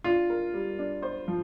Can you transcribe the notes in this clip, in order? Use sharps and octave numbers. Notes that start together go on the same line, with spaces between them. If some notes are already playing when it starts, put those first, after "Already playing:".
D4 F4
A#4
G3
D4
C5
F3